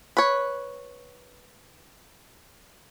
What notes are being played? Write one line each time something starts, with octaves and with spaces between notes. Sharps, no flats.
B4 C#5